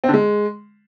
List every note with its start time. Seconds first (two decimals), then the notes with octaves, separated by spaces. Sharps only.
0.04 C4
0.09 D3
0.14 G#3